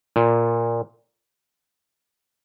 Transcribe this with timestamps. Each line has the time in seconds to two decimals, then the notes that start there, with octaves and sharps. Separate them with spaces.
0.16 A#2